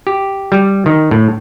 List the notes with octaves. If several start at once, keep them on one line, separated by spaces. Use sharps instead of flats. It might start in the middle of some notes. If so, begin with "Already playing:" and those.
G4
G3
D#3
A2